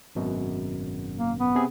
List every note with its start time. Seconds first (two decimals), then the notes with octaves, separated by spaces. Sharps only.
0.15 G#1 F#2 B2
1.17 A#3
1.39 B3
1.55 C3 C4 G#4